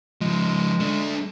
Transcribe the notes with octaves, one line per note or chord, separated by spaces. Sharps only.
C#3 F3 G#3
A3 D4